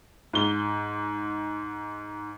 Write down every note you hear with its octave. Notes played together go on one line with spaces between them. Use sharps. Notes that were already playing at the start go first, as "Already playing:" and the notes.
G#2 G7